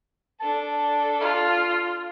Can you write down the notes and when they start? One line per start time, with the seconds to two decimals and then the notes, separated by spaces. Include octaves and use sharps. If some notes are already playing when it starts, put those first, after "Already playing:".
0.41 D4 A4 A5
1.20 F4